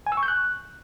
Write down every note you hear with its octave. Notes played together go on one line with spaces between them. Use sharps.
G#5
E6
C#6
G6
F#6